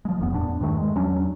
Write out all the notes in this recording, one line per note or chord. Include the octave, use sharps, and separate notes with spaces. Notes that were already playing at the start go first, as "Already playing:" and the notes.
F3 G#3
E1 F#2 B3
E2 A2 C#4 D4
E2 G2 D#3 A3
G#3
E2 F#3 C#4 D4